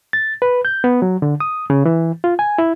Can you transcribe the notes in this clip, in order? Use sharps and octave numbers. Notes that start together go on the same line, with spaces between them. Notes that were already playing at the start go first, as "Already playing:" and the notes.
A6
B4
G6
B3
F#3
D3
D#6
C#3
E3
F4
G#5
E4